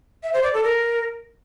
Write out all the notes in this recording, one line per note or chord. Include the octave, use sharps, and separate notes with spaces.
E5
C5
D5
A4
A#4